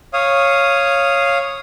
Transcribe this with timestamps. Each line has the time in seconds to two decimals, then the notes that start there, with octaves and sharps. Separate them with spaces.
0.14 C#5 F5 D#6